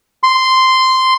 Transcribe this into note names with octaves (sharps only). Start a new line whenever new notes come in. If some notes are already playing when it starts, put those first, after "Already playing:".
C6